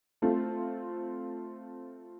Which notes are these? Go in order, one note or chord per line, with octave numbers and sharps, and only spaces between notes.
A3 C4 F4